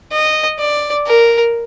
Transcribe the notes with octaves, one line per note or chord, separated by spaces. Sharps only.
D#5
D5
A#4